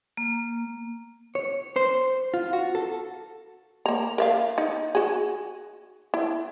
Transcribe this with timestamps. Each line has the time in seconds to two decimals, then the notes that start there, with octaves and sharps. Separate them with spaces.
0.17 A#3
1.35 C#5
1.76 C5
2.34 F4
2.53 F#4
2.75 A4
3.86 A#3 A#5
4.18 A#4 E5 F5
4.58 D#4
4.95 F#4 G#4
6.14 E4